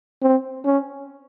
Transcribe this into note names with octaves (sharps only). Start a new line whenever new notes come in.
C4
C#4